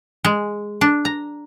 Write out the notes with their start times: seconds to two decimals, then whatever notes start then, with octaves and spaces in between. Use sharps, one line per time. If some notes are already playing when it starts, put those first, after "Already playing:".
0.25 G#3
0.81 D4
1.05 A#5